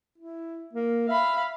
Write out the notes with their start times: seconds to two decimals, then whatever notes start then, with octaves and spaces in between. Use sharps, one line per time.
0.18 E4
0.73 A#3
1.08 E5 F5 B5